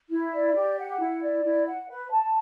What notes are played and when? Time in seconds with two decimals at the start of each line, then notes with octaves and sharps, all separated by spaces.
0.10 E4
0.33 D5
0.55 G4
0.78 F#5
0.99 E4
1.22 D5
1.44 E4
1.66 F#5
1.89 B4
2.11 A5